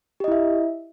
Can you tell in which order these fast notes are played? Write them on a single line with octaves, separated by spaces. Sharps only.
G4 D#5 E4 E5